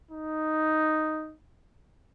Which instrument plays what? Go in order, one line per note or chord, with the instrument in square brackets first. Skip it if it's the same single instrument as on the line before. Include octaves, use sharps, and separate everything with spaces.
[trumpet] D#4